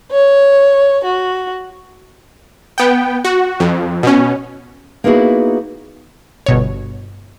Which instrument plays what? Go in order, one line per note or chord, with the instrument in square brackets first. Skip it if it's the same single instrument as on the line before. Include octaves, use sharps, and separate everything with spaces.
[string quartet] C#5
F#4
[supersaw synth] B3 G5
F#4
F2
B2 C#4
[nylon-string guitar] A#3 B3 D#4 E4 F#4 G#4
[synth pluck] G1 B2 C#5